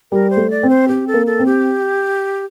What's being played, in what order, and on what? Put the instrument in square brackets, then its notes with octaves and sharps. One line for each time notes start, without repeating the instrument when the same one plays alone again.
[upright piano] G3 [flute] A#4
[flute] C5
[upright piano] A3
[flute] D5
[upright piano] C4
[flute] C5
[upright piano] C4 [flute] G4
[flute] A4
[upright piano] A#3
[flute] A4
[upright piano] C4
[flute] G4